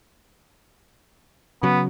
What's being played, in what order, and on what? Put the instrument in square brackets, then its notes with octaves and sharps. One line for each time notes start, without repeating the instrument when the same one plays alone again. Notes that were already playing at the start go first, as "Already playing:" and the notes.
[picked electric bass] C#3 F#3 [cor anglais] B3